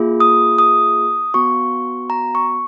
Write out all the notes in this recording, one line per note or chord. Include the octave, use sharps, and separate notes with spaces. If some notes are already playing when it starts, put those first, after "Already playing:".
Already playing: A#3 F4 G#4
D#6
D#6
B3 F#4 C#6
A#5
C#6